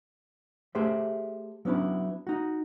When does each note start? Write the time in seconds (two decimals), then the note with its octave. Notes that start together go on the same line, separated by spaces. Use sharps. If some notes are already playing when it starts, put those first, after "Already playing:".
0.75 A3 G4 G#4 C5 D5 E5
1.65 F#3 B3 C#4 D4 E4
2.27 D#4 F#4